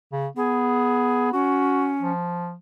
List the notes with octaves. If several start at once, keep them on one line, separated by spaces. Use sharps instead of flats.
C#3
B3 G#4
C#4 F#4
F3